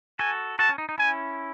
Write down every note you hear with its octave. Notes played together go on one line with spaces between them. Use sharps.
F#4 A4 G#5
F#4 A4 A5
C#4
D#4
D#4
C#4 E4 G#5